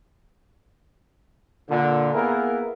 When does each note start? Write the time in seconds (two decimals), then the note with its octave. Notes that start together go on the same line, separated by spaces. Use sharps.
1.69 A#2 D3
2.14 A#3 B3 E4 G#4 A#4